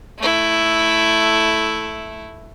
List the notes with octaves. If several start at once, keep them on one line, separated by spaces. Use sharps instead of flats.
A3 E4